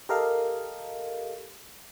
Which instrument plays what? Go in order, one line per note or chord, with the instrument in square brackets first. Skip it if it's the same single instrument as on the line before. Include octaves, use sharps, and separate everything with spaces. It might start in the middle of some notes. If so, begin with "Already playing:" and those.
[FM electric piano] G4 A4 A#4 D#5 F5